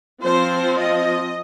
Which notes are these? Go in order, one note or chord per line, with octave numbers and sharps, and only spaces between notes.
F3 C4 C5
D#5